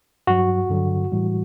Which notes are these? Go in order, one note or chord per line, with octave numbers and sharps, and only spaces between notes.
G2 F#3 F#4
G2 D3 F#3
A2 E3 G3